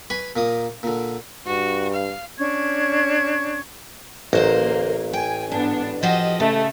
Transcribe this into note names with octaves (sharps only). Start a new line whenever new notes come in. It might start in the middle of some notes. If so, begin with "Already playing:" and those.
B4 G#5 B5 C#6
A#2 A#3 D#6
A#2 D3
G2 F#4
F5
C#4 D4 C#6 G#6
A1 D2 A#3 C5 D#5
G5 G#5
G#2 B3 D4
F3 F#4 G4 D#5
C#3 A3